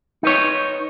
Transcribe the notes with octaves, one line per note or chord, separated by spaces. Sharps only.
D#4 B4 C#5